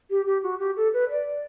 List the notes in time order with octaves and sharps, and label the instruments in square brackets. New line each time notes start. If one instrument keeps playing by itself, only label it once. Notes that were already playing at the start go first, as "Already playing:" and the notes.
[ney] G4
G4
F#4
G4
A4
B4
D5